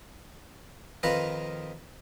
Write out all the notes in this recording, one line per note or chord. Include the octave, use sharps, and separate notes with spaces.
F2 D#3 D#4 F4 B4 D#5